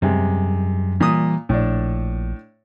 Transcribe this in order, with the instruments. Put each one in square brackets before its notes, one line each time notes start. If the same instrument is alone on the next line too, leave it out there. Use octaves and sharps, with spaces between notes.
[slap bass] F#2 G3 [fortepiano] C3 G#3
[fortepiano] A#2 D#6 [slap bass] E3 G3
[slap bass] A#1 [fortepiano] A2 D4